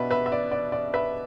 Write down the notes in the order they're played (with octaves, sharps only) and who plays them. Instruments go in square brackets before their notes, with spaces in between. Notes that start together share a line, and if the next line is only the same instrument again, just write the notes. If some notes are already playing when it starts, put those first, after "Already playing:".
Already playing: [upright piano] B2 B3 B4 D5 E5
B4 E5
E5
D5
D5
D5
B4 E5